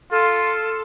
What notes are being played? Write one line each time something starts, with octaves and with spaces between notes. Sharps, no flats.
F4 A4